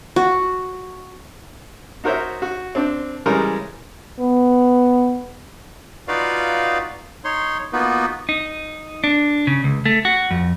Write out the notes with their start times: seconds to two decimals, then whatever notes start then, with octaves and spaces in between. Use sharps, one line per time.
0.16 F#4
2.04 D#4 F#4 A#4 C5 C#5 E5
2.42 F#4
2.75 C4 D4
3.26 C#3 E3 G3 G#3 A#4 C#5
4.19 B3
6.08 D#4 F4 F#4 B4 D5 F5
7.24 D#4 C#5 C6
7.73 A#3 B3 D#4 F4 F#4 B4
8.29 D#4
9.04 D4
9.47 C#3
9.64 C#2
9.86 A3
10.05 F#4
10.31 F2